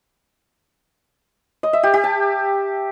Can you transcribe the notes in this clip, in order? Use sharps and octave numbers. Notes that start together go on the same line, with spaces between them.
D#5
E5
G4
G4
A5